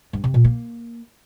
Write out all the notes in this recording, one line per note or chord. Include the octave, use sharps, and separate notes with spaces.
G2
C3
A#2
A#3